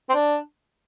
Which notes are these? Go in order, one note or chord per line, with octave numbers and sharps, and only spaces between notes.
C4
D4